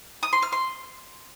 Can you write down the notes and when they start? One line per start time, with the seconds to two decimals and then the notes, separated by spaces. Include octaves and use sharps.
0.23 D#6
0.33 C6
0.42 F6
0.52 C6